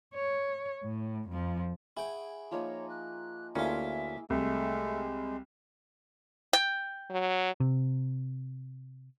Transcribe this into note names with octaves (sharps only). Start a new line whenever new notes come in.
C#5
A2
F2 F3
E4 G#4 C#5 F#5 G5
F3 A#3 D#4 C#5
F#6
D2 A#3 C#4 E4 F4 G#4 E5
C2 G#3 A3
G5
F#3
C3